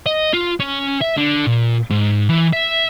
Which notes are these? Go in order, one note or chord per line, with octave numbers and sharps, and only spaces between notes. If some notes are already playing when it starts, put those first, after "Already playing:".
D#5
F4
C#4
E5
D3
A#2
G#2
E3
E5